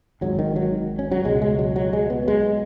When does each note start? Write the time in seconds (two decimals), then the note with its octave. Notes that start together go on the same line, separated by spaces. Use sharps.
0.21 G#1 G#2 F#3
0.39 D#3
0.56 F#3
0.99 C#4
1.11 F#3
1.24 C#2 B2 G#3
1.42 G#3
1.59 F#3
1.76 F#3
1.93 G#3
2.10 B3
2.27 B1 B2 G#3